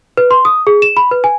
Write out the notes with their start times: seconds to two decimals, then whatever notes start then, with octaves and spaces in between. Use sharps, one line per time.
0.17 B4
0.31 C6
0.45 D#6
0.67 G#4
0.82 E7
0.97 B5
1.11 B4
1.24 G#5